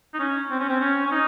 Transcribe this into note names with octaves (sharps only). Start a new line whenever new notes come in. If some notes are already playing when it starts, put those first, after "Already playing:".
D#4
C#4
C4
C#4
C4
C#4
C#4
D#4